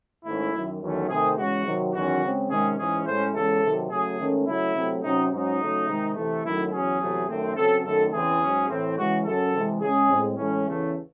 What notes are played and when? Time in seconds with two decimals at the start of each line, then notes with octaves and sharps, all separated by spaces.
0.24 G#2 D#3 A3 C#4 E4
0.53 F#2 D#3 F#3
0.81 E2 D#3 F#3 A3 C#4
1.09 C3 D#3 A3 C4 G#4
1.37 E2 C#3 G#3 F#4
1.65 C3 D#3 F#3
1.93 E2 D#3 F#3 C#4 F#4
2.22 C#3 G#3 C4
2.49 C3 D#3 G#3 C#4 G#4
2.78 G#2 E3 G#3 C#4 G#4
3.06 A2 G#3 C#4 C5
3.34 E2 C#3 G#3 A4
3.62 C3 D#3 F#3
3.90 C#3 F#3 A3 G#4
4.18 G#2 D#3 A3 C#4
4.47 C#3 F#3 A3 E4
4.75 C3 F#3 A3 C4
5.03 C3 F#3 C#4 D#4
5.31 G#2 F#3 C#4 D#4
5.60 C#3 F#3 A3
5.88 C3 D#3 G#3
6.16 C3 E3 A3
6.44 F#2 D#3 F#3 A3 E4
6.72 E2 C#3 F#3 C#4 G#4
7.00 E2 C3 F#3 A3
7.28 F#2 D#3 A3 C4
7.56 C#3 F#3 C4 A4
7.84 F#2 D#3 A3 A4
8.12 E2 C#3 E3 C4 G#4
8.41 G#2 F#3 C#4
8.69 A2 E3 C4
8.97 C#3 E3 G#3 F#4
9.25 F#2 C#3 F#3 C#4 A4
9.53 C3 E3 G#3
9.81 C#3 G#3 C#4 G#4
10.09 A2 G#3 C4
10.38 A2 E3 G#3 C#4
10.66 E2 C#3 E3 A3